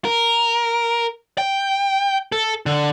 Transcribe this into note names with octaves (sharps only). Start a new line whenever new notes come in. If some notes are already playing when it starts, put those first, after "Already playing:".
A#4
G5
A4
D3